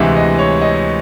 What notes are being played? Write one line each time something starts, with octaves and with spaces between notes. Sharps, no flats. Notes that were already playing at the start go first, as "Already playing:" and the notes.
Already playing: D2 C3 E3 G#3 E5
D#5
C#5
D#5